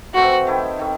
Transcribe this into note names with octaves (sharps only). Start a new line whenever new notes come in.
E3 A3 C4 F#4
D#3 A3 E4
D#3 A3